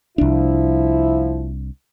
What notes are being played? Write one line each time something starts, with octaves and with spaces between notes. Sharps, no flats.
C2 F3 D4 E4